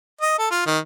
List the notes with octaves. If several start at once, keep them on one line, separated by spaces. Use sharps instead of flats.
D#5
A4
F4
D#3